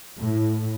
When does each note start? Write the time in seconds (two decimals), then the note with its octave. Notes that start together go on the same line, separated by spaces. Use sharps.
0.19 A2